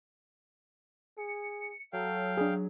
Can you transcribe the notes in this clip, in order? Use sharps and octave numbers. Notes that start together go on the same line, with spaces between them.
G#4 C#7
F#3 A4 F5 G5
D4 G#4